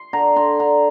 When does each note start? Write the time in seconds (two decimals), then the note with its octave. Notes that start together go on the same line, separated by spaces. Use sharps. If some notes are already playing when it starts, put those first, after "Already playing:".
Already playing: C6
0.13 D3 A#5
0.36 D3 C6
0.60 D3 A#5